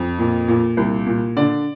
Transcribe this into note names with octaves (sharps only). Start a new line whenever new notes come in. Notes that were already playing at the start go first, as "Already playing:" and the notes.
Already playing: F2
A#2
A#2
C2
A#2
D3 D5